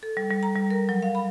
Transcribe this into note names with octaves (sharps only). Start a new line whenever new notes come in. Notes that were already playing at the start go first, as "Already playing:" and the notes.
A4
G3
G3
A#5
G3
A#4
F#3
F5
B5